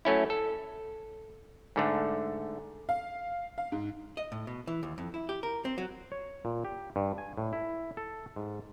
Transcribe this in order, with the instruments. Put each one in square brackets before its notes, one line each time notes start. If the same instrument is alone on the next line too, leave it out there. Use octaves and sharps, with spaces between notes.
[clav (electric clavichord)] F#3 A3 C#4 E4
A4
G#2 D3 A3
[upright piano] F5
F5
G#2
[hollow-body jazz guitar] D#5
A2
B2
E3
D#2
F2
E4
G4
A#4
C4
F#3
[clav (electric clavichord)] C#5
A#2
G4
G2
G#5
A2
E4
A4
G#2